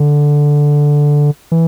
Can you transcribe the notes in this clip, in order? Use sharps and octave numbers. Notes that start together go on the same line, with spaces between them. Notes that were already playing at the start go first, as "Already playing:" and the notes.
Already playing: D3
E3